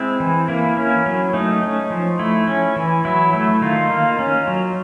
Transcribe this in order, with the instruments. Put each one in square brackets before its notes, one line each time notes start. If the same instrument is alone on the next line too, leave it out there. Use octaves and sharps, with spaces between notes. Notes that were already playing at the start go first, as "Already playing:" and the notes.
Already playing: [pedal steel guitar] G#3 C4 E4
E3
A#3 E4
C#4
F#3
A3 D#4
C#4
F3
A3 E4
C#4
E3
F#3 E4
A3 E4
D#3 D#4 F4
A#3
C#4
F#3